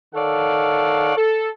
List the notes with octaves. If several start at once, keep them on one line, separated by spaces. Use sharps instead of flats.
D#3 A4 C#5 D5 F5 F#5
A4